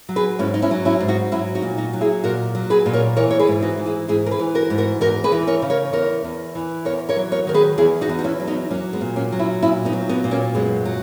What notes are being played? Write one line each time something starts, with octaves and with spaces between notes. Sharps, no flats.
F#3
G#4 B4
G#2 C#4 E4
D#4
C#4 E4
F#3
C#4 E4
G#2
D#4 F#4
F#3 C#4 E4
D#4 F#4
A#2
D#4 F#4
F#3
E4 G#4
A#2 F#4 A#4
F#3
G#4 B4
A#2
A#4 C#5
E3 A#4 C#5
C#5
G#4 B4
G#2
D#4 F#4
E3
E4 G#4
G#2 E4 G#4
A#4
G#4 B4
E3
F#4 A#4
G#2
F#4 A#4
E2 F#4 A#4
G#4 B4
E3
A#4 C#5
C#3
A#4 C#5
E2 A#4 C#5
E2
E3
E2 A#4 C#5
A#4 C#5
F#3
A#4 C#5
D#3 A#4
G#4 B4
E2 E4 G#4
D#4 F#4
E2
F#4
C#4 E4
F#3
B3 D#4
F#3 A#3 C#4
G#3 B3
A#2
A#3 C#4
F#3
C#4 E4
A#2 C#4 E4
B3 D#4
F#3
B3 D#4
A#2
A#3 C#4
F#2 G#3 B3
F#3